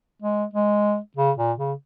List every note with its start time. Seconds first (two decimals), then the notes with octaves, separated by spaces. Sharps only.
0.22 G#3
0.53 G#3
1.17 C#3
1.37 A#2
1.58 C#3